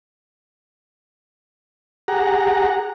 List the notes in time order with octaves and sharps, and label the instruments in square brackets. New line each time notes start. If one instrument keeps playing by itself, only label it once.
[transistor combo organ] G4 G#4 F#5 A#5